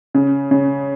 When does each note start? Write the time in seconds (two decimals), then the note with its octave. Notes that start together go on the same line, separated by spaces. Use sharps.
0.14 C#3
0.51 C#3